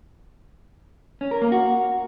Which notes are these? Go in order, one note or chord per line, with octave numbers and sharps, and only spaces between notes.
C#4
A#4
A#3
F#4